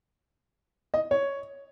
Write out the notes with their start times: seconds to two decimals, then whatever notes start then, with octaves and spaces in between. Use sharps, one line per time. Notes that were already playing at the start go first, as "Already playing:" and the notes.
0.94 D#5
1.11 C#5